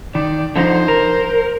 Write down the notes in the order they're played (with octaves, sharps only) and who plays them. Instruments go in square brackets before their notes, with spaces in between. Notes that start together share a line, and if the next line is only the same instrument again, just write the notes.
[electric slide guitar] D#3 [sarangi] D5
[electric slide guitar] D3 F3 D#4 [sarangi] C5
[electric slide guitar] A#4